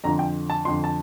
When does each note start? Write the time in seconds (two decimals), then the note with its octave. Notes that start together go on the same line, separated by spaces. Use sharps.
0.04 F2 D3 F3 A#5
0.19 G5
0.50 A5
0.65 F2 D3 F3 C6
0.84 A5